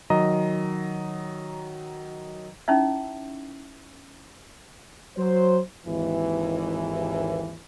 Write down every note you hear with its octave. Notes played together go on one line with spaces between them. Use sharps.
D#3 F#3 D#5 A#5
C#4 D#4 E4 E5
F#3 C5
G#1 D#2 E3